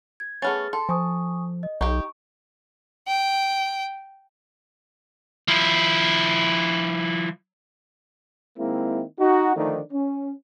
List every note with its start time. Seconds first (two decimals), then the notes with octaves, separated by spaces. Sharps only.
0.20 G#6
0.42 A3 B3 C#4 G#4 F6 A6
0.73 A4 C6
0.89 F3 G#5 C#6 D#6
1.63 D#5
1.81 B1 D#4 G4 C#6
3.07 G5
5.48 F3 E4
8.59 D#3 G#3 A#3 C4 E4
9.20 D#4 F#4
9.57 D3 D#3 F3 A3 D4 D#4
9.93 C#4